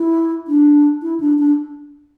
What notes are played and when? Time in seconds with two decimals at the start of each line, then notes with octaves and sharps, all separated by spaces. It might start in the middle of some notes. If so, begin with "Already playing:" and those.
Already playing: E4
0.48 D4
1.02 E4
1.20 D4
1.38 D4